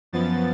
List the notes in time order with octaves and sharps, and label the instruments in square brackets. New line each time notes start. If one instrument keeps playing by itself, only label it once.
[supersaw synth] F#2 F3 B3 A6